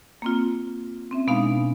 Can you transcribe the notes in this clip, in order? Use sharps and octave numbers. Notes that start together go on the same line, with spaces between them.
A#3 C4 F4
C4 C#4 E5
B2 G#3 B3 D4 D#4 F5